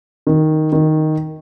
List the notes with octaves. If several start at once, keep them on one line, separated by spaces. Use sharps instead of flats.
D#3
D#3